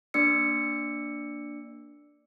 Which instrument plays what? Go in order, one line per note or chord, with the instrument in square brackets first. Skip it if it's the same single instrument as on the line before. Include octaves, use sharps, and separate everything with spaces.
[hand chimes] A#3 D4 D5 E6 C#7